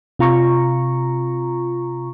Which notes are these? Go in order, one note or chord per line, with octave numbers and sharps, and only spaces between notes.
C3 F4 A#5 C#6